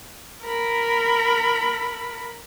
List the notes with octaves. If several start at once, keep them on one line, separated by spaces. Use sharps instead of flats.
A#4 B5